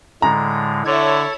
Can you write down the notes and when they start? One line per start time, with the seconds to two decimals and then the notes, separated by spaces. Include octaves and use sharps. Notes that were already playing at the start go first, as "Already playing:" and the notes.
0.22 A2 D3 G#3 A#5
0.86 D3 E4 A4 C#5 G#6